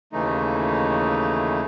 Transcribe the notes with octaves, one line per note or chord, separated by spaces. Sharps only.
D#2 C#3 E3 A3 D#4